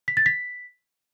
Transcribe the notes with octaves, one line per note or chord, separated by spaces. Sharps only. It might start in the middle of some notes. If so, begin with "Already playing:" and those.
B6
A6
B6